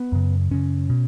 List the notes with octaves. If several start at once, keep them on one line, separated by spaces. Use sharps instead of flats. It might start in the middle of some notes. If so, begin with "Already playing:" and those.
Already playing: B3
F#2 C#3
F#2 C#3 C#4
B2